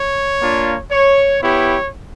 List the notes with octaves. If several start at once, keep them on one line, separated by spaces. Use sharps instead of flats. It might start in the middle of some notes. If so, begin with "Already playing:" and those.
Already playing: C#5
A#3 D4 F4
C#5
B3 E4 G4 C#5